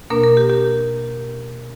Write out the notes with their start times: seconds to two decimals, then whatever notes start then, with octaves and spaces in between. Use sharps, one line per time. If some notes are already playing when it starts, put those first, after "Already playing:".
0.10 B2 A#3 D4 A#4
0.24 A#4
0.37 G4
0.50 G4